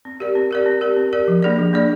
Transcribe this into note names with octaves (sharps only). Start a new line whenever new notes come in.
C4
G4 A#4 D5
C4
G4 A#4 D5
C4
G4 A#4 D5
C4
G4 A#4 D5
F3
A#3 D4 G#4 D5
F3
A#3 D4 G#4 D5